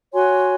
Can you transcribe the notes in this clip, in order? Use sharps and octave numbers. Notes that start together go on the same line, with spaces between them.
F#4 C#5 G#5 C6